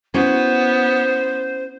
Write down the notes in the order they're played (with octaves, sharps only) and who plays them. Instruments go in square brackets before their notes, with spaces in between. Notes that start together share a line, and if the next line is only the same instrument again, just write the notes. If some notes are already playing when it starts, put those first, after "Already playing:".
[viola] B3 [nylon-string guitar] C#4 E4 F#4 [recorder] C5